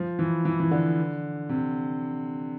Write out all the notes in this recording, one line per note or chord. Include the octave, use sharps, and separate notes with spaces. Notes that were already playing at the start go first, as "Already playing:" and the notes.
Already playing: F3
E3
E3
E3
D3
C3